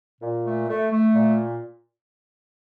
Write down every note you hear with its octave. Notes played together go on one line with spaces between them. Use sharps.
A#2
A3
A3
A3
A#2